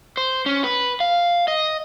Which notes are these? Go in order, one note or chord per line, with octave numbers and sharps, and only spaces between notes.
C5
C#4
B4
F5
D#5